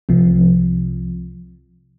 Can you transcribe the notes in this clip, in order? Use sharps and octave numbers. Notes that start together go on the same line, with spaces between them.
C2 C3 F3